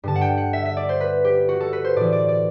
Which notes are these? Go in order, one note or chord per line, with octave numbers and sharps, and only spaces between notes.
G2 D3 A5
F#5
G5
F#5
E5
E5
D5
C5
B4
G4
F#4
A4
B4
C5
A2 E3 D5
D5
D5